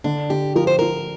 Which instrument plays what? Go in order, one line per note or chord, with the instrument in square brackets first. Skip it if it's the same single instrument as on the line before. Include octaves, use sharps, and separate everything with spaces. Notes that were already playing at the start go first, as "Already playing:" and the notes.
[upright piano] D3 [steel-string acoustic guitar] D4
[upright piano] D3 [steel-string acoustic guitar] G4
[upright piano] F3 [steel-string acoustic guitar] A#4
[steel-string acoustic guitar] C5
[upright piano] F3 [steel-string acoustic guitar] A#4